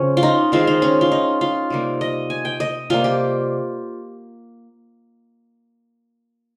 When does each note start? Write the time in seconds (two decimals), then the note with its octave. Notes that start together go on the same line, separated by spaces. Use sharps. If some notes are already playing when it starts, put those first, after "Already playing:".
Already playing: C#3 F3 C4 C#4
0.17 F4
0.23 D#4
0.52 D#3 G#3 C4 F4
0.67 D#4
0.82 C#4
1.01 F4
1.12 D#4
1.41 F4
1.70 C3 G3 A#3
2.01 D#5
2.30 G#5
2.45 G5
2.60 D#5
2.90 C3 G3 A#3 F4
3.04 G4